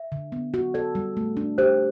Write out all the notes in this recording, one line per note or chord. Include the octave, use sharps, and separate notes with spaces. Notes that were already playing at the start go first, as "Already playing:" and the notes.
Already playing: E5
D3
B3
F#4
A4 D5
G3
A3
D4
G4 C5